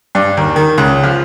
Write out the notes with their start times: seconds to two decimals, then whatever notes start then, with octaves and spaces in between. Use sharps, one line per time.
0.15 G2
0.37 D#2
0.56 D#3
0.78 C#2
1.03 F3